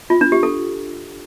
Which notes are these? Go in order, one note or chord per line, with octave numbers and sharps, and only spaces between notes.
F4
D4
G4
A4